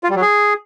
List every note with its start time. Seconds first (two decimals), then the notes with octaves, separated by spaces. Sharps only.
0.04 F4
0.10 G3
0.16 F#3
0.22 G#4